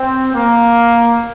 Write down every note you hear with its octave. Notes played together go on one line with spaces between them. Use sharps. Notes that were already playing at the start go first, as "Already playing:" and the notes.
Already playing: C4
A#3